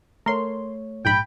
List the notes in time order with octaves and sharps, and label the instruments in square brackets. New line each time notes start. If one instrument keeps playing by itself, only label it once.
[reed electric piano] A3 C#5 [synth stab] A#4 C6
[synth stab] A#1 G#2 B5 [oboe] G5